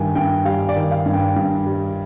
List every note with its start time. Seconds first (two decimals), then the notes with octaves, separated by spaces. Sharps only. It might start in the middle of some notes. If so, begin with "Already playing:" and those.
Already playing: G2 D#3 G5 G#5
0.15 G2 G5
0.45 G3 F5
0.69 D5
0.76 D#3
0.91 F5
1.06 G2
1.13 G5
1.36 G2
1.66 G3